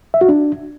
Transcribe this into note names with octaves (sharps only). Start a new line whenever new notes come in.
E5
F#4
D4